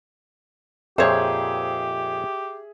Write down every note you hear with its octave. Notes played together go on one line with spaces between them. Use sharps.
F2 A#2 G4 G#4 C5 C#5 E5